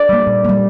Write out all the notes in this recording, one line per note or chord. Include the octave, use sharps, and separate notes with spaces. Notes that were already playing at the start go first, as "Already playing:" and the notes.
Already playing: D5
G3 A#3
A#2
G3 A#3